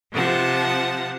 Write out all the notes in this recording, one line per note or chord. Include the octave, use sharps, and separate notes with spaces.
C3 F3 F#5 A5